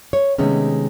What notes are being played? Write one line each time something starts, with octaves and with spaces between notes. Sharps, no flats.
C#5
C3 D#3 G#3 A3 B3 C#4